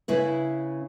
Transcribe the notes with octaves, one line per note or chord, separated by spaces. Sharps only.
C#3 E4 B4